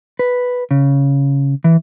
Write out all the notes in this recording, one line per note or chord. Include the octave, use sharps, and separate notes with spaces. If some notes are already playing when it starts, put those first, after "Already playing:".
B4
C#3
E3